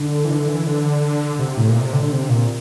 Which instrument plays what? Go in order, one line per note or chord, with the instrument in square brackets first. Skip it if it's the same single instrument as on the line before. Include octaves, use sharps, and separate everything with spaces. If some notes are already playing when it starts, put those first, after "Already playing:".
Already playing: [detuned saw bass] D3
E3
D3
E3
D3
C3
A2
A#2
C3
D3
D3
C3
A#2